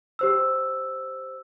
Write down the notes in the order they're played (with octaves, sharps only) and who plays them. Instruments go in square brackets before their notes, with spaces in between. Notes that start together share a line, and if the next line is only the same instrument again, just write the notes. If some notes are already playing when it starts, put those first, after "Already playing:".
[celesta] G4 C5 E6